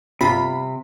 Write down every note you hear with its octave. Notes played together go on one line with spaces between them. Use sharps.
G1 C3 F4 B5